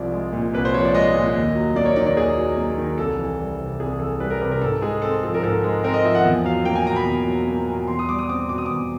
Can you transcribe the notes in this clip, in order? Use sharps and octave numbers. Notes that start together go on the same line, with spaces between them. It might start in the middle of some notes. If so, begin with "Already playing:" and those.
Already playing: C2 F3 D5
G#3
A#2
C2 B4
C5
F3 C#5
D5
G#3 D#5
A#2
D#2
F#3
A#3 D5
C#5
D#3 D5
D5
D#2 G#4
F#3
A#3
D#3
C2 A4
E3
G3
C3
C2 G#4
E3 A4
G3 B4
A#4
C3 B4
A#4
G#2 A4
G#3 G#4
C4 A4
F3 A4
A#4
G#2 A4
G#3
C4 A#4
D#5
F3 E5
F#5
E2
F#3 F5
A#3 G5
G#5
B2 A#5
B5
E2
F#3
A#3
B2
E2 C6
D#6
G3 D6
D#6
C4 D6
B2 D6
D#6
E2 D6